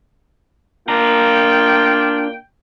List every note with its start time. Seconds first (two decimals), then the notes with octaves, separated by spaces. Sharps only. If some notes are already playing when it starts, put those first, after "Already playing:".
0.88 A#3 D4 F4 G5 A#5